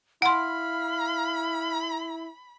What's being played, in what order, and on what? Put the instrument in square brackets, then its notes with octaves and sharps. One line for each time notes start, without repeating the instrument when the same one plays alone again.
[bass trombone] E4 [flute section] F5 F6 [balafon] F#5 C6 [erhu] B5